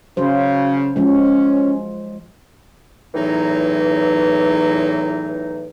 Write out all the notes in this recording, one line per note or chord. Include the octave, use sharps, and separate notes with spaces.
C#3 F#3 C5
F3 G#3 C#4
E2 A2 E3 F#3 D#4